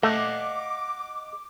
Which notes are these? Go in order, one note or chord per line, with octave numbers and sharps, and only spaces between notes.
A3 D#5 F5 F#5 D6